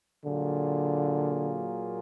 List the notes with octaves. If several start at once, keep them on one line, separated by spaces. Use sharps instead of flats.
A#2 D3 F#3 A#3 F4 G#4